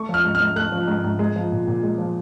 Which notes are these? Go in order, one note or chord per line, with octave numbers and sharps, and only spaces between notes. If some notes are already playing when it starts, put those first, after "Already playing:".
Already playing: A3 C#6
F3
F6
G#2
F6
G#2
A3 F#6
F3
G#2
G#2
G#3
F3
A#2
A#2
G#3
F3